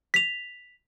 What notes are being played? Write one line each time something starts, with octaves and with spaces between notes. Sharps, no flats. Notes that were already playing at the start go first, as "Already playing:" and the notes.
B6 F7